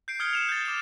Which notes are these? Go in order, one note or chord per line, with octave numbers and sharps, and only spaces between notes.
G6 C7 D7
D#6 F6 G#6 C#7 G7
C#7 E7 F7
G6 A6
D6 E7